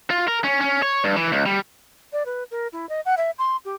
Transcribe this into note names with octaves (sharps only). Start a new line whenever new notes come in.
F4
A#4
C#4
C#4
C#5
G2
E3
C#2
G3
D5
B4
A#4
E4
D#5
F#5
E5
C6
G4